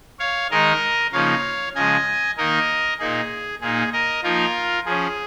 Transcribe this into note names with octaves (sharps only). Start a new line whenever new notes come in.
C#5 F5
D#3 G#3 D#4 A#4 D#5
C#3 F3 A#3 D#4 C#5 F5
C#3 F3 G#3 D#5 G#5
D#3 A#3 D#4 A#4 D#5
A#2 A#3 D#4 G#4
A#2 A#3 D#4 G#4
A#4 D#5
F3 A#3 D#4 F4 A#4
F3 C#4 G#4